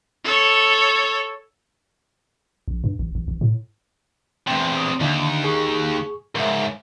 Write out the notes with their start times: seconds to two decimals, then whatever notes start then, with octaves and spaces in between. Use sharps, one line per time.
0.25 A4 C#5
2.68 A#1
2.84 G2
2.99 A1
3.15 A1
3.28 A1
3.41 A2
4.47 E2 C3 G5 C6
4.77 D6 D#6
5.01 D#2 D3 D4 E4
5.44 G#4 C#6
6.35 C#2 G#2 A#4 E5